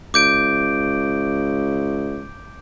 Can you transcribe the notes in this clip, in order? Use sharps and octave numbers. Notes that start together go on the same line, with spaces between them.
C#2 D6 G6 D7